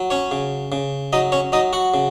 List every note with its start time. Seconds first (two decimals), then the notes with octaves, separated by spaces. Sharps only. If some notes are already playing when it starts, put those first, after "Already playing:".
Already playing: F#3
0.10 C#4 C#5
0.31 C#3
0.72 C#3
1.13 F#3 D#4 D#5
1.32 C#4 C#5
1.52 F#3 D#4 D#5
1.73 F#4 F#5
1.94 C#3